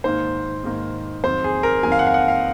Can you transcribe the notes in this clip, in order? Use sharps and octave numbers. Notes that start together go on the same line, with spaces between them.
G#2 D#3 A#3 C5
G#2 D#3 A#3
F2 D#3 F#3 C5
G#4
A#4
F2 D#3 F#3 G#5
F5
F#5
F5
F#5
F5